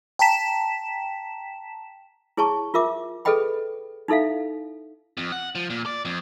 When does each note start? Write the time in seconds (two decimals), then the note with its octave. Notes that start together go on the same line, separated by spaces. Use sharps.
0.19 G5 A5 A#5 B6 E7
2.37 E4 G#4 C#5 A5 A#5 C#6
2.74 F4 A#4 E5 D6
3.25 G#4 A4 B4 D#5 G5 B5
4.08 D#4 E4 A4 E5 F5
5.17 F2
5.32 F#5
5.55 F3
5.70 A#2
5.86 D5
6.05 F2